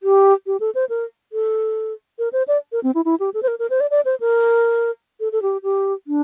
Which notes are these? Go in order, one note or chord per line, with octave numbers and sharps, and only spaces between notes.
G4
G4
A4
C5
A#4
A4
A#4
C5
D5
A#4
C4
E4
E4
G4
A4
C5
A#4
A#4
C5
D5
D5
C5
A#4
A4
A4
G4
G4
D4